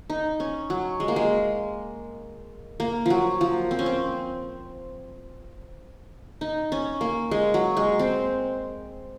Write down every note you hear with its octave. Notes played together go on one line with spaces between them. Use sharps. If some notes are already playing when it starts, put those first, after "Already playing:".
D#4
C#4
F#3
G#3
A#3
G#3
A#3
F3 F#3
F3
C4
C#4
C4
D#4
C#4
A#3
G#3
F#3
G#3
C4